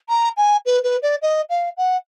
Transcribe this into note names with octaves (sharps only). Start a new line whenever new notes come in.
A#5
G#5
B4
B4
D5
D#5
F5
F#5